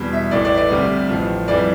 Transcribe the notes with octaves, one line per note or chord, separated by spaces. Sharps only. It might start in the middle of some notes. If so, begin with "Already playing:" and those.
Already playing: E2 B2 G3
E5
A1 A2 E3 A3 D5
D5
D5
D2 C3 G3
A1 A2 F3
F2 E3 G3 D5